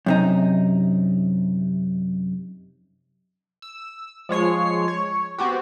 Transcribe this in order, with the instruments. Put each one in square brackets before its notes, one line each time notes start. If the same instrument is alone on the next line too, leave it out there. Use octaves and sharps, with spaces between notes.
[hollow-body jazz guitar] F#2 C3 D#4
[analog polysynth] E6
F3 G#3 C#5 C7
C#5
B3 C4 F#4 G4